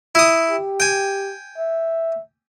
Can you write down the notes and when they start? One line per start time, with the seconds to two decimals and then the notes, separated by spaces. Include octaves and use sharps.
0.15 E4 D#6
0.50 G4
0.80 G5 G#5
1.58 E5